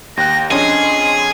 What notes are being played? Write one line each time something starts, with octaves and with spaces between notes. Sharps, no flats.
D#2 G5 F#6 A#6
F2 C#4 D4 G#4 D#5 C6